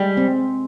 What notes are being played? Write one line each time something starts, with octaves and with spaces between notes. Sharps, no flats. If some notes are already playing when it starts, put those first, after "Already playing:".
Already playing: G3 G#3
C4